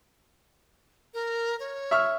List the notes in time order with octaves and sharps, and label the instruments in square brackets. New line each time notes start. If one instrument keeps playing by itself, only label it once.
[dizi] A#4
C#5
[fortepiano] E5 C#6 F6